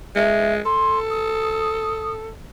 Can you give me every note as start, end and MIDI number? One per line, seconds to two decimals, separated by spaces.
0.16 0.60 56
0.16 0.54 76
0.65 2.30 69
0.65 0.99 84
1.10 2.11 87